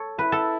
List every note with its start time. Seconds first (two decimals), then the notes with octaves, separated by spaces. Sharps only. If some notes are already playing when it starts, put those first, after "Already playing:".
Already playing: A4 C#5
0.19 E4 B4
0.32 A4